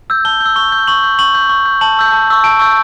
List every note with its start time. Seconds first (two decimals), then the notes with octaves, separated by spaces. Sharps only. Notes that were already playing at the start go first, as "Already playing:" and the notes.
0.10 E6 G6
0.25 A5 G7
0.40 G6
0.46 E6
0.56 C#6 G7
0.72 G6
0.87 C#6 F#7
1.03 G6
1.19 C#6 F#7
1.35 G6
1.49 C#6
1.65 G6
1.81 A5 F#7
1.97 C#6 E6 G6
2.12 A5
2.28 C#6 E6 G6
2.44 A5 D7
2.59 C#6 E6 G6